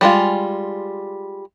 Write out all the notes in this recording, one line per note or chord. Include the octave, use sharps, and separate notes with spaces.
G3 G#3 F4